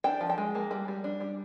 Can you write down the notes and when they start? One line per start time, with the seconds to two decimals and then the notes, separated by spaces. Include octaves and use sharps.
0.04 D4 G5
0.21 F3
0.30 G5
0.38 G#3
0.55 A#3
0.71 G3
0.88 G3
1.04 D4
1.21 G3